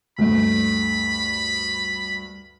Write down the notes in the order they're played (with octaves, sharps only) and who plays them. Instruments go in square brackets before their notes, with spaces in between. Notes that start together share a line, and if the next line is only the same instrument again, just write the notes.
[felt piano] D2 G2 [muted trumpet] B5